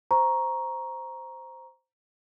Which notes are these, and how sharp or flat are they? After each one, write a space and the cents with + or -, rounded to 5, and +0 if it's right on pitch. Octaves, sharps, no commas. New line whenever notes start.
C5 -5 A#5 +10 C#6 +0